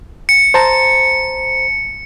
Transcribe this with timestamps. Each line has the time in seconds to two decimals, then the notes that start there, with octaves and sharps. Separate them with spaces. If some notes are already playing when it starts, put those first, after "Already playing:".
0.29 C#7
0.54 C5 A5 A#5